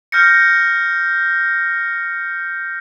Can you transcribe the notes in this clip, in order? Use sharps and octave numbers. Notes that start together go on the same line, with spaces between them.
F6 G6 A#6 C#7